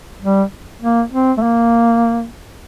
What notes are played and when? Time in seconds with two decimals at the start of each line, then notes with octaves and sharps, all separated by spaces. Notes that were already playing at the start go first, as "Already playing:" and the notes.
0.22 G3
0.82 A#3
1.12 C4
1.37 A3
1.42 A#3